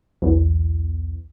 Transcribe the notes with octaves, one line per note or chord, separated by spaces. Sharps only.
B1 E2